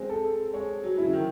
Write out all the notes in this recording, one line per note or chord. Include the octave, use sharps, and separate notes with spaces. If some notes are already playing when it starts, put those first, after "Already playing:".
Already playing: G#3 C4
A4
G#3 C#5
F#3
C#3 E4
D#3